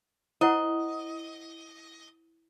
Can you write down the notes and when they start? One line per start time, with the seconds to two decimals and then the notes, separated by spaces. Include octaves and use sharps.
0.41 E4 C5 D#5 F#5